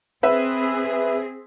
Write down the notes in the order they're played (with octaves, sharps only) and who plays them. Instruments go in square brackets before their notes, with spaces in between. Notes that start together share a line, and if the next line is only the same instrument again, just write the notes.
[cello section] C4 G#4 [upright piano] B4 E5